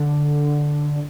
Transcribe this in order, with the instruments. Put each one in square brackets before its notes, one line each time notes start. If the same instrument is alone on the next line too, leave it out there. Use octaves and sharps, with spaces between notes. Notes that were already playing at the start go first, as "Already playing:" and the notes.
Already playing: [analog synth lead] D3